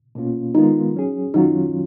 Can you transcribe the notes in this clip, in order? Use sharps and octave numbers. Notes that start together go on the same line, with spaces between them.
B2 A#3 C#4 F4
D#3 G#3 B3 D#4 F4 A#4
F#3 C#4 G#4
F#2 D#3 F#3 C#4 D#4 F4